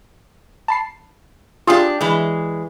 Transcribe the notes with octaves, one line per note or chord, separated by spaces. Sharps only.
A5 B5 C7
D4 F4 G4 G#4 F5
E3 G#3